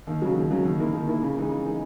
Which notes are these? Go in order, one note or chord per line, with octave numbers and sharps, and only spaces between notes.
D#2
C#3 F#3
D#2
C#3 F#3
D#2
D#3 A#3 E4
D#2
D#3 A#3 E4
C#3
E3 G#3 D#4
C#3
E3 G#3 D#4